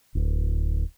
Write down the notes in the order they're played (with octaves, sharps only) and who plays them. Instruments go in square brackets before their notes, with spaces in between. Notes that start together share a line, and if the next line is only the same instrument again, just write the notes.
[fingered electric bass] D1